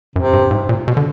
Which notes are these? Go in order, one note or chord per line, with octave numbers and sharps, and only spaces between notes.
F#2 C3
G2
G#2
A#2
B2
D3